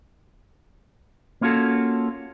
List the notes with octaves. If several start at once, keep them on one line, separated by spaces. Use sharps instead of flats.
A#3 C#4 F4 F#4 A4